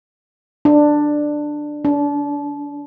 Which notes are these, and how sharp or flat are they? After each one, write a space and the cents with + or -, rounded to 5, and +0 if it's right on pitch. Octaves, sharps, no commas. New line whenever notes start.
D4 +10
D4 -30